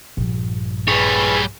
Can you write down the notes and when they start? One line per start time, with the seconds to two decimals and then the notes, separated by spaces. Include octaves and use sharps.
0.17 A#1 G2
0.88 G3 G#4 B4 C#5